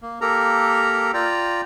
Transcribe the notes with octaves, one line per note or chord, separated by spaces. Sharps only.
A#3
A#3 G4 A4 A#4 A#5
F4 D5 G5 A#5